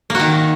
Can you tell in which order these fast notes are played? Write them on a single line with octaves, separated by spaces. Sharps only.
A#3 F#4 D#3